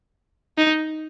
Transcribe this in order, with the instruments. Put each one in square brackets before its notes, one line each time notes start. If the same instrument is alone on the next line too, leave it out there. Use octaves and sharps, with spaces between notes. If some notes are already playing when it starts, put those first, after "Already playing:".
[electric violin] D#4